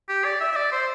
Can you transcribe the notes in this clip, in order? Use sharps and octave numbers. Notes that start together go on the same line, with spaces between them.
G4
D5
E5
E5
D5
C5